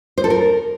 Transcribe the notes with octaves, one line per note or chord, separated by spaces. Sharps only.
C5
A4
A#4